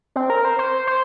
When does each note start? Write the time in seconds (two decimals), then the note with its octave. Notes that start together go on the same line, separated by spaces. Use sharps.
0.16 C4
0.30 A#4
0.45 C5
0.59 C5
0.87 C5